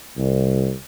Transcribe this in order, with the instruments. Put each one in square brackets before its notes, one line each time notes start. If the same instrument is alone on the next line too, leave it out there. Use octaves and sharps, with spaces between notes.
[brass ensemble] C2